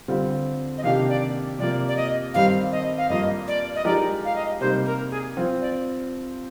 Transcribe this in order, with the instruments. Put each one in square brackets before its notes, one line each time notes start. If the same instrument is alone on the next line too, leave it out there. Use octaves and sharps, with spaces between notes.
[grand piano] D3 G3 C4 F4
[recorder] D#5
[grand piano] C3 D#3 A#3 D4 G4 [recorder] F5
[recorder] D5
[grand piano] C3 F3 A#3 [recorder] D5
[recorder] D5
D#5
[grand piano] G2 D#3 G3 C4 [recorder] F5
[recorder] D#5
F5
[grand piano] G2 F3 A#3 [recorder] D#5
[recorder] D5
D#5
[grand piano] F3 G#3 D#4 G4 A#4 [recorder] D5
[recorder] F5
D#5
[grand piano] C3 G3 A#3 D#4 [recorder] C5
[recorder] A#4
G#4
[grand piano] F3 C4 F4
[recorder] D5